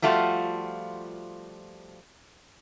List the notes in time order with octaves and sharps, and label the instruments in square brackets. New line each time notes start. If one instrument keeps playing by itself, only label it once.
[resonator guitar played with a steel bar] F3 G3 A3 F4 F#4